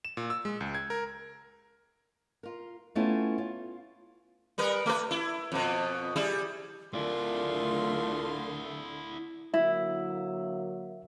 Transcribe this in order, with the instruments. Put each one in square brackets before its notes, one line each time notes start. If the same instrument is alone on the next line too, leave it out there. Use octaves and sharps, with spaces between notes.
[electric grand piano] E7
A#2
E6
G#3
C#2
G#6
A#4
[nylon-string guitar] F4 A#4
A3 B3 C#4 E4 F4
F4
[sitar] G3 A#4 B4
A3 B4
E4
F2 B2
G3 E4 G#4
[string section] D3 A3 C6 [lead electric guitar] E4 D5 [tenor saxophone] F4 [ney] A#4
[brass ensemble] D3 F#3 A#3 [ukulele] E4 [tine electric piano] E5